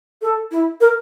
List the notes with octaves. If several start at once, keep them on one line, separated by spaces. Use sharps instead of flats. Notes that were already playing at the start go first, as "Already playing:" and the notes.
A4
E4
A#4